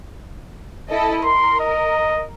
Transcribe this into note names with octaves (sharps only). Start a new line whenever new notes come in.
E4 A4 D#5
A#4 C6
D#5